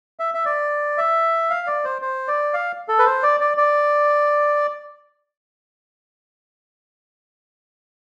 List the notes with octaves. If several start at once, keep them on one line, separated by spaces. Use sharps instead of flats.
E5
E5
D5
E5
F5
D5
C5
C5
D5
F5
A4
B4
C5
D5
D5
D5